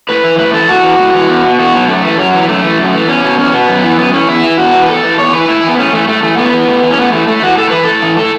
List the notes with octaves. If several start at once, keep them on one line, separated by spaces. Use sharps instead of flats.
A2 B4
E3
A2 B4
E3 A4
A2 F#4
E3
A2
E3
E2
B2
E2 F#4
B2 F#3
F#2 A3
E3
F#2 F#3
E3
F#2 A3
E3
F#2
E3
E2 C#4
B2
E2 C#4
B2 B3
F#2
E3
F#2 B3
E3 C#4
E2 E4
E3
E2 F#4
E3
B4
E2 A4
E3
E2 C#5
E3 B4
A2 E4
E3
B3
A2 C#4
E3 A3
A2 A3
E3 A3
A2 B3
E3
A2
E3
C#4
A2 B3
E3 A3
A2 A3
E3 F#4
A2 A4
E3 B4
A2 A4
E3
A2 A4